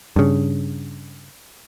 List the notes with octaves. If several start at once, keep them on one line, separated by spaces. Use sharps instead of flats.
G2 C#3